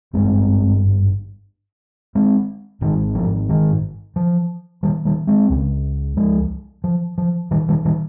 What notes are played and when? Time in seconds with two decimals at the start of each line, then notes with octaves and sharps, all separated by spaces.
0.13 G#1 G2 G#3 C4
2.15 G#3 C4
2.81 G#1 G#2 D#3
3.15 F3
3.49 D#3
4.16 F3
4.83 D#3 G3
5.05 D#3 G3
5.27 G#3 C4
5.50 C#2 C#3
6.17 F3 G#3
6.84 F3
7.18 F3
7.51 D#3 G3
7.69 D#3 G3
7.85 D#3 G3